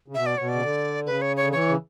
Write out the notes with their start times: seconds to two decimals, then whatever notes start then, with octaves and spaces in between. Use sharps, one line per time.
0.08 C#3
0.14 B2 E5
0.26 D5
0.38 B2 C#5
0.49 C#3 D5
0.61 D3
1.06 C#3 B4
1.22 C#5
1.37 C#5
1.42 D3
1.52 E3 C#5
1.68 C#3